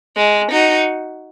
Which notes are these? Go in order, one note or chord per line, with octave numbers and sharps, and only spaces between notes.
G#3
D#4 F#4